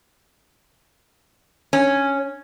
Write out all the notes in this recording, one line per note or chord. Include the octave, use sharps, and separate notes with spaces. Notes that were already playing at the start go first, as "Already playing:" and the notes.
C#4